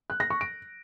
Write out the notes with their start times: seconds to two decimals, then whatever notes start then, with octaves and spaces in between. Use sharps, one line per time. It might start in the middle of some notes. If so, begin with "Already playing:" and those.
0.10 F#6
0.20 A#6
0.30 C#6
0.41 D7